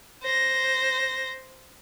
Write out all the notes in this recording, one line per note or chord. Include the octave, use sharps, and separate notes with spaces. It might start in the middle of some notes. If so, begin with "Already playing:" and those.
C5 A#6